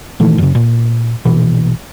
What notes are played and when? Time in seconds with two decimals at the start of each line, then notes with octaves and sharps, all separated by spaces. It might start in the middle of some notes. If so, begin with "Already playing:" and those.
0.20 A#2 D#3 E3 A3
0.38 F#2 C#3
0.55 A#2
1.25 A#1 B2 E3